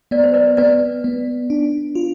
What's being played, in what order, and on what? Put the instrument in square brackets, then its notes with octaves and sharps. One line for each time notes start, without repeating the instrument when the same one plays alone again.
[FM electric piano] B3 [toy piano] D5
[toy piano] C5
B4 D5
[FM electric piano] B3 [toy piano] B4 D5
[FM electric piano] B3
D4
F4